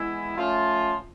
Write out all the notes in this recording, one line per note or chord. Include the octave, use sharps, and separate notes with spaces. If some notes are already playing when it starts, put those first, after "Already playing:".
Already playing: E3 G#3 B3 E4
F3 A3 C#4 F4